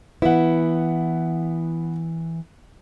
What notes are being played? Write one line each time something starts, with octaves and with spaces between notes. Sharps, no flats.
E3 B3 E4 F#5